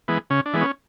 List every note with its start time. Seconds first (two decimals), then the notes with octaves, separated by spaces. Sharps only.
0.08 E3 G#3 B3
0.30 C#3 C#4
0.46 D4
0.53 E3 G#3 B3
0.61 C#4